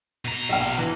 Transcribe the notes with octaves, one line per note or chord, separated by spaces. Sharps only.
B2 A#5
A#1 F5
E3